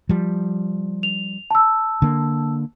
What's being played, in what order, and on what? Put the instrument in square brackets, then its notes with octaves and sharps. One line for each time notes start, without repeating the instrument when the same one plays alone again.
[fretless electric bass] F3 G3
[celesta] F7
A5 E6
[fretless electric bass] D3 A#3